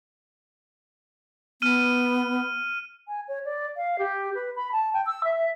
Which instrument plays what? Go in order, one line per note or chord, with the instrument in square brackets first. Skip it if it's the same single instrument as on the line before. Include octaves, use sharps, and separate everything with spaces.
[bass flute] B3 [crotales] F6 D#7
[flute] G#5
C#5
D5
F5
G4
B4
B5
A5
G5
E6
E5